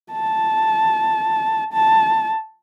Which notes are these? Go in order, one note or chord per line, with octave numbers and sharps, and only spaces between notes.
A5
A5